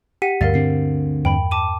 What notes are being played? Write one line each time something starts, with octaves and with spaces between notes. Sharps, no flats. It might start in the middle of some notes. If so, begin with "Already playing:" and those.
G4 F#5 B6 D#7
D2 G2 A#4 F5 A6
D2 D3 C4 C7
E2 G2 G5 B5
A5 D6 D#7